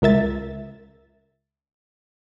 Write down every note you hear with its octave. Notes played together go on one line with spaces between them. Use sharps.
C#2 A#4 E5 A6